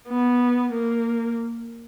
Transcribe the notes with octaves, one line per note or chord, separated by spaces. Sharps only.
B3
A#3